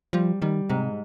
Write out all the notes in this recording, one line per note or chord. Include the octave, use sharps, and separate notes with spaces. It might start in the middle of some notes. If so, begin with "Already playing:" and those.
F3 G3
D#3 G3
G#2 C3